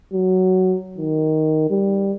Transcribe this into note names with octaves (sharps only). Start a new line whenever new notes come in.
F#3
D#3
G3